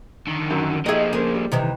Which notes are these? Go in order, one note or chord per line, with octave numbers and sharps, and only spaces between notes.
D3 D#3
F#2 F#3
A#2 F3 D#4 G4 G#4 D#5 E5
C#3 A#3 G#4 C5
G3
C3 D#3 E3